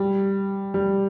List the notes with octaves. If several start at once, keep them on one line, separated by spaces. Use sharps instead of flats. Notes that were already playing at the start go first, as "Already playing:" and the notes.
Already playing: G3
G3